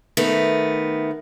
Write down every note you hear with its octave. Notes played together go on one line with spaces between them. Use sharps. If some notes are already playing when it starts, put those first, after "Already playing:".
D#3 A3 B3